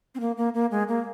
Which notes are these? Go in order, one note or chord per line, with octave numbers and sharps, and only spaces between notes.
C4
A#3
A#3
A#3
G#3
A#3